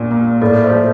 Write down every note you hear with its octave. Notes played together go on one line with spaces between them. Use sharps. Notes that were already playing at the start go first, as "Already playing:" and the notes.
Already playing: A#1 A#2
A#3
A2 A#4 D5
C5 E5
F3